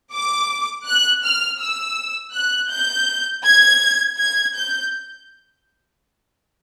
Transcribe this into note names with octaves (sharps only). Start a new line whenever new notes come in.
D6
F#6
F6
E6
F#6
G6
G#6
G#6
G6